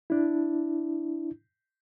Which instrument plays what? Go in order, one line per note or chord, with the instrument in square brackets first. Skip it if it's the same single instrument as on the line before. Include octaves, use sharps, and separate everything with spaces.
[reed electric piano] D4 E4